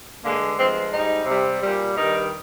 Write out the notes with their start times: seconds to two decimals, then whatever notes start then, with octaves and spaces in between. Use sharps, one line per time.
0.22 G2 D3 G#3 A#3
0.56 G2 F3 G#3 C4
0.91 G#2 G3 D#4
1.25 C3 G3
1.60 A#2 G3
1.94 G2 D#3 G3 D#4